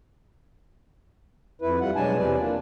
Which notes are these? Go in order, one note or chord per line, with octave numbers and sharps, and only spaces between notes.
F2 E4 B4
F2 G3 F4 F#5
B2 F#3 G#3 D4 G#5 A5
E2 C3 B4 D5
A#3 D4 F4